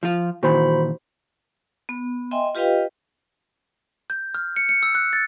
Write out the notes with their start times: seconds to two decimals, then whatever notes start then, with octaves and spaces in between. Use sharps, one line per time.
0.03 F3 F4
0.43 A#2 D#3 E3 F#4 C5 B5
1.89 B3
2.31 D#5 E5 G5 G#5 C6
2.55 F4 G4 B4 D#5 F5 G5
4.10 G6
4.35 F6
4.56 C#7
4.69 C#7
4.83 E6
4.95 F#6
5.13 A6